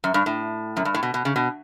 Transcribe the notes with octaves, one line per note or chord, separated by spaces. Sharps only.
F#2
G2
A2
F#2
G2
A2
B2
B2
C#3
B2